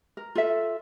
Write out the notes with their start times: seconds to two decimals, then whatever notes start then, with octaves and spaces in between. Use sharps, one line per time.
0.17 A#4
0.35 F4 A4 E5